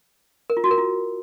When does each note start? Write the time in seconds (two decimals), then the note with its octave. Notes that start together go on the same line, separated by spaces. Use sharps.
0.50 A#4
0.57 F4
0.64 F#4
0.71 A#4
0.78 F4